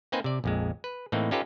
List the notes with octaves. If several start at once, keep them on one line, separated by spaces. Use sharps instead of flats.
A#3 C4 D#4 B4 C5 G#5
C3 D5
A#1 F2 G#3
B4
A2 E3 A#3 C4 D#4
C#4 D#4 F4 G4 A4 B4